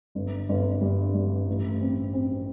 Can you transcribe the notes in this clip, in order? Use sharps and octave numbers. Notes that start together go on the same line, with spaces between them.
G1
G1
G2
G2
A1
C4
C4